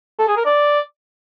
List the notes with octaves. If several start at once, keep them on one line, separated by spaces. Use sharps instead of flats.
A4
G#4
A#4
D5